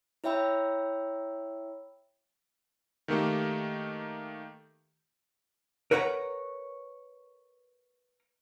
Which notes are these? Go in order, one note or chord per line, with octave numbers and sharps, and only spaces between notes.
E4 C#5 E5 G5 B5 E6
D#3 A3 A#3 G4
A#4 B4 C#5 F#5 A#5